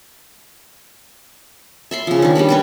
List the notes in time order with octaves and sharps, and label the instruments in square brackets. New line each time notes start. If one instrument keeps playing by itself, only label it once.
[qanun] E5 B5 C6
C#3 F3
D#3 D4
G3 D4 G4 B5
C#4 B4 G5